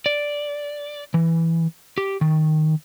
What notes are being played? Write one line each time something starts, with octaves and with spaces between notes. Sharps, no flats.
D5
E3
G4
D#3